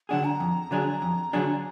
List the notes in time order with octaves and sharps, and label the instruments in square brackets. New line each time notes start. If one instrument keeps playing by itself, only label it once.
[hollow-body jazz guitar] D3 F#3 D4 G#4 [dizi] F#5
[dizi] A#5
[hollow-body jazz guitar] F2
D3 F#3 D4 G#4
F2
D3 F#3 D4 G#4